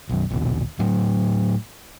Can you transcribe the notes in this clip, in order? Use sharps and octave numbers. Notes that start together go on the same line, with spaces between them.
B1 F#2
A#1 D#2 B2
A2 F#3